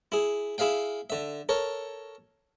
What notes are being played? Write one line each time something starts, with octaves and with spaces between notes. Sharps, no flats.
E4 G#4
E4 G#4 E5 F5 G5
D3 E5
A4 A#4 C#5